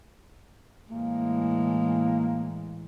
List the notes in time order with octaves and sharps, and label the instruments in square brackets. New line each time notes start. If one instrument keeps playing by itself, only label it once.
[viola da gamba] A2 E3 G#3 [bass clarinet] A#3